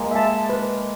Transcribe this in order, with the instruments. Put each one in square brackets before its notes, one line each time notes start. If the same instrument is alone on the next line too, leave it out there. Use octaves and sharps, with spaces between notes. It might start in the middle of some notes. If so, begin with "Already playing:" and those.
Already playing: [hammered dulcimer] G#3 A#3
[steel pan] E5 A5
B4